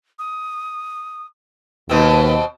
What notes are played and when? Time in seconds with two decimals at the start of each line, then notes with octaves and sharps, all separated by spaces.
0.19 D#6
1.89 D#2 B2 C4 B4